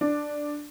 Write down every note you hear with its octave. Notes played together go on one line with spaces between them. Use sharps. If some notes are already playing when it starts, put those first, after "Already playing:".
D4